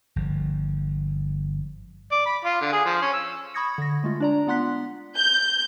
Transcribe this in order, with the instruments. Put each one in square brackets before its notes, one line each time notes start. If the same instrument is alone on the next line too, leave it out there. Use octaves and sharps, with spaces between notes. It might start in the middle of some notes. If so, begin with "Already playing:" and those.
[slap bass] G1 F3
[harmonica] D5
B5
F4
D3
G#4
F3
C#4
E6
[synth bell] B5 C#6 D#6 G#6 A#6 C#7
D3 A#6
G#3 A3 F4
D4 D5 A#5
B3 F4 F#5 C6 F#6 B6
[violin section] G6